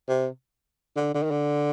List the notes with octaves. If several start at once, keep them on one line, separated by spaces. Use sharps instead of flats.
C3
D3
D3
D#3
D3